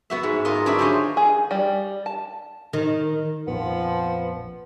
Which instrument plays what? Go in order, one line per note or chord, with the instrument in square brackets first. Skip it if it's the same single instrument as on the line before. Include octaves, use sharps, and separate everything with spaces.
[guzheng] B3 F#4 E5
G#2
F4 A#4 D#5
F#3 D4 F#4 B4 E5
F4 G4 G#4 C5 C#5 D#5
[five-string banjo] G#4
G3
A5
[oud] D#3
[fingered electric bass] A#1 F2 A#2 [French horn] F3 [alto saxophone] B3